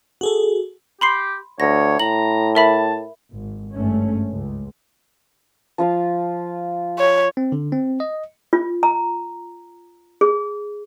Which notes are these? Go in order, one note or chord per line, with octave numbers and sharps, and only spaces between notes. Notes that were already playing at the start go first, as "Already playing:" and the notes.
F#4 G#4 A4
G4 B5 C6 C7
D2 C#5 A#6
A2 A#5 F#7
A#4 E5 A5 B5
G#1
G#1 G2 A3 C#4
C#2
F3 F4 F5
C#5
C4
D3
C4
D#5
F4
A#5
G#4